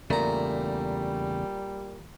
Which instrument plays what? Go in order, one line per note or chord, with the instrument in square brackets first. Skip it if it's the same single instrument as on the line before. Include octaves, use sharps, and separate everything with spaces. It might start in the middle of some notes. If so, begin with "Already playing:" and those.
[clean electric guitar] E2 C#3 A3 [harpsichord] A#2 A#5 [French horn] G3